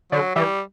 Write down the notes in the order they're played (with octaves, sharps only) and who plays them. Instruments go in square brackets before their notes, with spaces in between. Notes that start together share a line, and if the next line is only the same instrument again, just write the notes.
[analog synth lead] D3 [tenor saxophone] F#3
[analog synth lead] E3 [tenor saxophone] G3